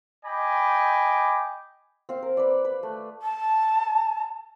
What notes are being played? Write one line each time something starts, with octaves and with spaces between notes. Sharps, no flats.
D#5 G5 G#5 B5 D6
C4 F5
A#4
B4 D5
B4
A3
A5